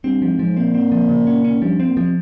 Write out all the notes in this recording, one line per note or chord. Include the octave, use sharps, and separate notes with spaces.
G2 C4
F3
G#2
F3
A#2 C4
C4
F3
C#3
C#4
C#4
G2 F3
C4
A#2
C3 F3